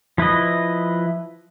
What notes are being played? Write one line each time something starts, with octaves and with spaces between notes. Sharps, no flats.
F3 E4 B4 D#5